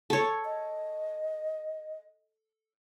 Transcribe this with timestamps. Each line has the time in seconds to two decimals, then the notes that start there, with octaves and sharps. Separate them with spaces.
0.10 A4 C#5
0.45 D#5